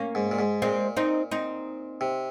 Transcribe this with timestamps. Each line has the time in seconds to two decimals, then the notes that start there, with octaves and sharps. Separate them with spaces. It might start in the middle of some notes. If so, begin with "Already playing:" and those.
Already playing: A#3 C#4
0.15 G#2
0.31 A#2
0.39 G#2
0.62 A#2 G#3 C4
0.97 C4 D#4
1.31 C4 D#4
2.01 C3